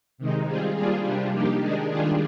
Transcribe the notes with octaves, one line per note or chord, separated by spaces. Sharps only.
C3 D#3 G#3 D#4
G3 C4 F4 G#4
G3 A#3 D4 F4 G#4
C3 G3 D4
F3 A#3 D#4 G4
D#3 G#3 D4 G#4
D#3 G3 D4 F4 G#4